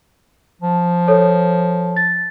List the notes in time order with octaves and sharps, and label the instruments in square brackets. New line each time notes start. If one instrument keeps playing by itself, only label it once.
[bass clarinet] F3
[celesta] A4 C#5
A6